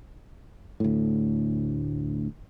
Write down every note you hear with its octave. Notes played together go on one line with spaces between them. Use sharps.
D2 A2